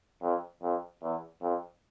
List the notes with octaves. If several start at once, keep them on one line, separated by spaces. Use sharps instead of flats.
F2
F2
E2
F2